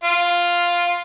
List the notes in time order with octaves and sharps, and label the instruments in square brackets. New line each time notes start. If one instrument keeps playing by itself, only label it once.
[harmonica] F4